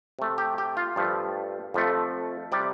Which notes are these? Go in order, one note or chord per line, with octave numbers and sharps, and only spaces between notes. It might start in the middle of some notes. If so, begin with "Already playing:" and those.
C3 A3
G4
G4
F4
G2 F3 A3
F2 F3 A3
C3 G3 D5